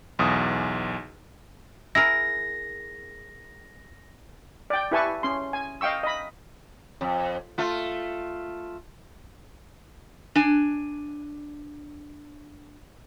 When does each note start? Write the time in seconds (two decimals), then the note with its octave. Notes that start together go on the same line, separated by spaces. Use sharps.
0.19 B1 E2 D#6
1.95 E4 G#4 A#4 A#6
4.70 D5 G5
4.91 E4 G4 B4 G#5 A5 C#6
5.23 C#4 C6
5.53 G#5
5.81 D#5 F5 G5 C#6 E6
6.03 D#5 B5
7.01 F2
7.58 A3 F4
10.35 D4 G#5